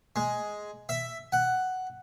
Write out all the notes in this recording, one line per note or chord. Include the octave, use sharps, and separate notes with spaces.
G#3
E5
F#5